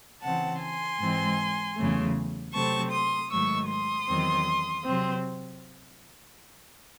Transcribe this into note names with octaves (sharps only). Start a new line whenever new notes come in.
C#3 E3 C4 F#5 A5
G#5 C6
G#2 E3 G#3 C4
E2 C#3 F#3 A3
C3 F#3 A3 C4 A5 C#6
C6 D#6
G#2 D#3 F#3 A3 C#6 E6
C6 D#6
E2 D#3 F#3 C4
C3 F#3 C4